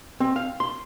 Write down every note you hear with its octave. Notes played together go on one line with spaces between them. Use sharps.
C4
F5
C6